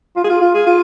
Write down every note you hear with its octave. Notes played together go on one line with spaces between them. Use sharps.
F4
G#4
F4
F4
G#4
F4